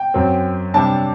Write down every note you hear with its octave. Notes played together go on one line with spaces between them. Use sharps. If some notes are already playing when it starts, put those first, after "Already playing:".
Already playing: G5
F#2 F#3 C4
C3 G3 D4 A5